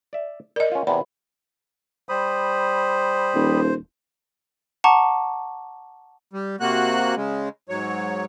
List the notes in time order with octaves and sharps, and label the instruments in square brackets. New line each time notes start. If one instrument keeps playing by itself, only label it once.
[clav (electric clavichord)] D5 E5
[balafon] A#4 D#5 [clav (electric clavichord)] D5
[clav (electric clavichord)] C#4 F4
[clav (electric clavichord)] E2 C3 [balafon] B5
[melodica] G3 B5 D#6 [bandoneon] C5
[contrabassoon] D#1
[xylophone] F#5 A5 A#5 C#6 D6
[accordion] G3
C3 A#3 F#4 F#6
C#3 G#3
G#2 F#3 C#5